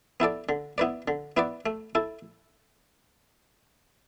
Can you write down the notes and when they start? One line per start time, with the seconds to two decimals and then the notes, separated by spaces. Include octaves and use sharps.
0.20 B3 E4 A4 D5
0.49 D3
0.78 B3 E4 B4 D5
1.08 D3
1.37 B3 E4 B4 D5
1.66 A3
1.95 E4 A4